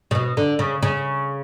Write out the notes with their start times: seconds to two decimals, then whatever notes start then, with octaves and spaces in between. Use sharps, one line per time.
0.11 C#3
0.15 B2
0.37 D3
0.59 C#3
0.82 C#3